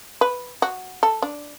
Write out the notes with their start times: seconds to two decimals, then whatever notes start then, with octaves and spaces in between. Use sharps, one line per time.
0.21 B4
0.62 F#4
1.03 A4
1.22 D4